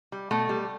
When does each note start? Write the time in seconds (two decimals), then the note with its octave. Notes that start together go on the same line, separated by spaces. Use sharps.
0.12 G3
0.31 B2 A3
0.49 G3